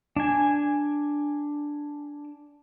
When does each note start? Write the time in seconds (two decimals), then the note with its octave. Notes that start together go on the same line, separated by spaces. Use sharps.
0.16 D4 G#5